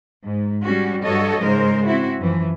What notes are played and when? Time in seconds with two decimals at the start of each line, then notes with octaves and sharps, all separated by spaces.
0.23 G#2
0.63 G3 C#4 F#4
1.03 G2 F#3 F#4 A4 C#5 D#5
1.41 G#2 C#3 G#3 A#4 C5
1.86 C4 E4 F#4
2.18 F#2 E3 F3